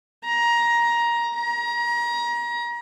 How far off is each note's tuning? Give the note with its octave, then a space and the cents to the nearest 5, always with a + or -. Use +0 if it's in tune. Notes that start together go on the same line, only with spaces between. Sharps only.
A#5 +15
A#5 +30